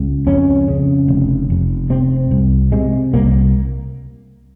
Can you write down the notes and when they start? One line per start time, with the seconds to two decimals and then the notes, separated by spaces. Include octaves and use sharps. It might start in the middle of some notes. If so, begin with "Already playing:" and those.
Already playing: C#2 C#3
0.27 F2 C#4
0.68 C#3
1.08 F1
1.50 F1
1.90 C3 C4
2.31 C2
2.72 C3 G#3
3.14 C2 A#3